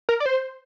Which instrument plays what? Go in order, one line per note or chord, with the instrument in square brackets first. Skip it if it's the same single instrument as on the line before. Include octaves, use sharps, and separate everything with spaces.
[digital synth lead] A#4
D5
C5